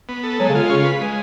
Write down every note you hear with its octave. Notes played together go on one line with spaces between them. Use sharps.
B3
A4
F#3 G#3
C#3
D3 F4
C#3 C#4
B4
G#3